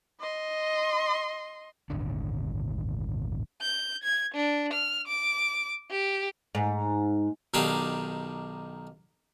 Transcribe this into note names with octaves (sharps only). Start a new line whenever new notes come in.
D#5 C6
D#1 G#1 D3 D4
G6
G#6
D4
F6
D6
G4
G#2
B1 D#3 D4 G4 G#4 F5